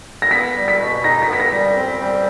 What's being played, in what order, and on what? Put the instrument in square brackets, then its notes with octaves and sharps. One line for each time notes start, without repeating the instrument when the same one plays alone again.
[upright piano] A#6
[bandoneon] B3 [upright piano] B6
[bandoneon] G3
[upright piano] B6
[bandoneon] B2
[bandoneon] D#4 [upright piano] A#6
[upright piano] B6
[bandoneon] B3
[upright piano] B6
A#6
[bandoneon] G3
C4
G3